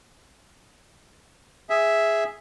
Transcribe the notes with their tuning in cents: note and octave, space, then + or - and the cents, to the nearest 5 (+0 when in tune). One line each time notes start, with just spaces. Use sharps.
G#4 +0 E5 +0